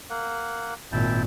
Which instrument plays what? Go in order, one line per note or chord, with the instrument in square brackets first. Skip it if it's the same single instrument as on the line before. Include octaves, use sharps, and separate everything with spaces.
[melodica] A#3 F#5
[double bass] G#1 A#2 [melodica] E4 G5 A5